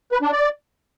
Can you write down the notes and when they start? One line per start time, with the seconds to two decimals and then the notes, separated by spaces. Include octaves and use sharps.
0.12 B4
0.22 D4
0.32 D5